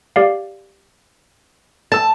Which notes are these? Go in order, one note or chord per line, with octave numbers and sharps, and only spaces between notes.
G4 D5 F5
A5 E6 A6